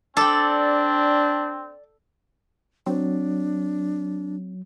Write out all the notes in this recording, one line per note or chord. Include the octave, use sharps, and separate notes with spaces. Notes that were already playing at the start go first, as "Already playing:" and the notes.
C4 D4 A4 D5 G5
F#3 C4 D4